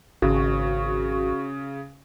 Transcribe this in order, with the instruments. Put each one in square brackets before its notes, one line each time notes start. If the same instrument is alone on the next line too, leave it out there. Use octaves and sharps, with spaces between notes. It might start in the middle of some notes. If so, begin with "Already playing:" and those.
[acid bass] G#1 [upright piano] C#3 [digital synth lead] F#4